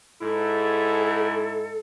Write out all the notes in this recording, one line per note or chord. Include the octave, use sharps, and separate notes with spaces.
G#2 E4 A4